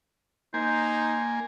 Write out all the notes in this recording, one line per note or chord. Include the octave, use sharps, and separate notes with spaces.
A#3 D#4 C5 G#5